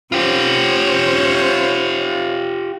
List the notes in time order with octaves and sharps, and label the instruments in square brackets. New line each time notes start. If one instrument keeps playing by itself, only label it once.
[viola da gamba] C#4 C5 C#5 [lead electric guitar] F4 G4